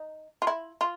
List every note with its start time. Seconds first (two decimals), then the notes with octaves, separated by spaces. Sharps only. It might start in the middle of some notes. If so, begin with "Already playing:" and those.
Already playing: D#4
0.42 F4
0.47 E4
0.81 F4